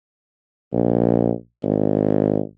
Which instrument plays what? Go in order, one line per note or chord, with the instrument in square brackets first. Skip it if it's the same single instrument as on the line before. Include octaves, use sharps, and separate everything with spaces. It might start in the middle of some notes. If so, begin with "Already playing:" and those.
[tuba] A#1
G#1